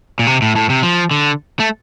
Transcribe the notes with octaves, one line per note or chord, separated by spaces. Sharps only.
A#2
C3
A2
A2
C3
F3
D3
A3